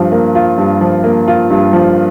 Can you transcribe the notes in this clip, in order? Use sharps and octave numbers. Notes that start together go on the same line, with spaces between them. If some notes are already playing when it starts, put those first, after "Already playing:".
Already playing: G2 F3
A#3
F4
G2
F3
A#3
F4
G2
F3